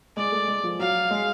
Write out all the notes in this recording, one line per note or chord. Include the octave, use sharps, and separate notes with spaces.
G#3 D5
A3
G#3
F3
F#3 F5
G#3